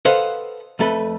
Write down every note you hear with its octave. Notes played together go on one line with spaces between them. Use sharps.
A4 B4 C5 D#5 F5 F#5
F2 A3 A4 B4